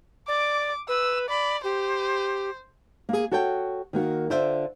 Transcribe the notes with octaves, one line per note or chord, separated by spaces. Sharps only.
D5 D6
B4 E6
D5 B5
G4 C5
A#3 G#4
F#4 A4 C#5 F#5 G5
D#3 A#3 F#4
D3 F4 C5 D5 E5